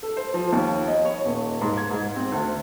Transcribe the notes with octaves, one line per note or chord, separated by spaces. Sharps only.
A4
C5
F3
D#2
D#5
C#5
D#1
G#2
G#6
G#2
C4
D2